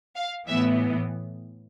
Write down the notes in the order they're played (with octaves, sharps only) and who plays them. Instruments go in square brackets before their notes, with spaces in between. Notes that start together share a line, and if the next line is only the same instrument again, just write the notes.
[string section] F5
A2 E3 B3 E5